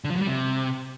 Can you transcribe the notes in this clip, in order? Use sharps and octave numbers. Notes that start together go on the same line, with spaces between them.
D3
F3
F#3
G3
C3